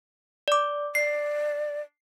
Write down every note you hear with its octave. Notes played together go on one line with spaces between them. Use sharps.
D5 D6
D5 C7